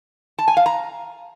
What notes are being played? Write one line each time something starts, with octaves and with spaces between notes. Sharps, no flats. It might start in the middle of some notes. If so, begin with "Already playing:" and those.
A5
G#5
F5
A#5